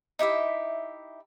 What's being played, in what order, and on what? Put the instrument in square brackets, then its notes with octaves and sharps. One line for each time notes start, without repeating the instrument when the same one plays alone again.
[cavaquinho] D#4 E4 G4 E5